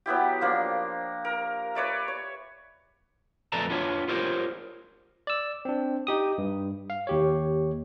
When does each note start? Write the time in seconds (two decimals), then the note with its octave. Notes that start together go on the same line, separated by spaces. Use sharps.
0.06 F#3 B3 E4 G4
0.41 F3 A#3 D4
1.25 A#4
1.75 B4 C#5 D5 E5
2.08 C#5
3.52 F2 A3 B4 D5 A5 A#5
3.70 B3 D4 F4 C#5
4.08 F4 G4 A#4 C5 C#5
5.27 D5 E6
5.65 C4 D4
6.07 D#4 G4 D#6
6.38 G2
6.90 F5
7.07 D#2 G4 C#5